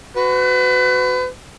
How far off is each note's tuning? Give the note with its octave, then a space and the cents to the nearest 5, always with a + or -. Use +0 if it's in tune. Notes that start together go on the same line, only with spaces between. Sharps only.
F#4 +0 B4 +35